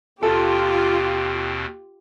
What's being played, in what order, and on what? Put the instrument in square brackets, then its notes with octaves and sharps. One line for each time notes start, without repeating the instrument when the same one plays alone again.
[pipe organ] D#2 B2 C4 [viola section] F4 [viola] G4 [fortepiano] A4